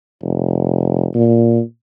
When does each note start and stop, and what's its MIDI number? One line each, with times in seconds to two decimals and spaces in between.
0.22 1.07 29
1.15 1.61 46